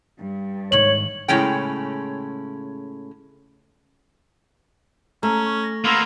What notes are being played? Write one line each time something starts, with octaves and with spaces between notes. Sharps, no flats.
G2
G#2 D#3 C#5 F#7
A2 C#3 G#3 C#4 G5
A3 C#4 A#5
C#6
A#6
A#3 B3 F5 C6 E6